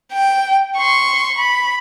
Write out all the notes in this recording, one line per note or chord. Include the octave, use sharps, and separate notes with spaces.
G5
C6 C#6
B5